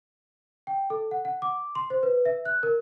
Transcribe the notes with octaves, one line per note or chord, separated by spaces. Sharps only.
G5
A4
F#5
F#5
D6
C6
C5
B4
E5
F#6
A#4